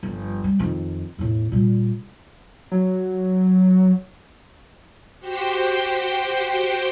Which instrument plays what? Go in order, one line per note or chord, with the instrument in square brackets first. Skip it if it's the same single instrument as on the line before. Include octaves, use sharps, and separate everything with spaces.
[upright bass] G1 F3
G3
F2 D#3
E2 A2
A#2 G3
[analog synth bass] F#3
[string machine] F#4 G4 C5 G5